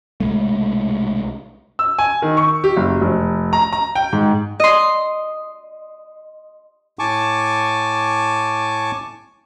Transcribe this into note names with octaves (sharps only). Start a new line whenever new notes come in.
C2 B2 G#3 A3
E6
G#5
D#3
C#6
G4
F#1
F1
A#5
A#5
G5
G#2
D#5 C6
A2 G#5 A5 C#6 D6